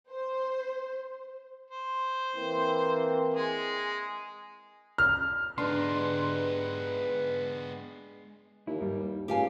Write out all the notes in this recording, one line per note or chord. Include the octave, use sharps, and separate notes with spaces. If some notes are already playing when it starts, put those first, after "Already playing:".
C5
C5
E3 A#3 C4
G#3 G#4
F6
G#3 B3 D4 D#4 G4 B4 C6
D#2 E4
G2 G3
C#2 G4 F5 G#5